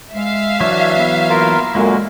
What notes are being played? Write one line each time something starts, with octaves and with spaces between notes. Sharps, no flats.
G#3 E5 F5
E3 F#3 D4 C#5
B3
A#3 F4 A#4
F#2 A#2 D3 G#3 A#3 F#4